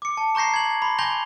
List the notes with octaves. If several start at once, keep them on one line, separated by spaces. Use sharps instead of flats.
D6 C#7
A5
A#5 C#6 G6 A#6 C7
G#6 F#7
B5 C6
G#5 C6 G6 A#6 F7 G7